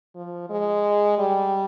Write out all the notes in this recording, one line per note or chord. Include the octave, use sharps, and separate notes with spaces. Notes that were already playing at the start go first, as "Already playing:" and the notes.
F3
G#3
G3